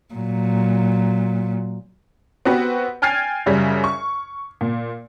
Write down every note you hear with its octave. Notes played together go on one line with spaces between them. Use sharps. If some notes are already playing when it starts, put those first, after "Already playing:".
A#2 F#3
B3 C4 F#4 G4 B4
G5 G#5 F6 G#6 A6 C7
F#2 C#3 G3
C#6
A#2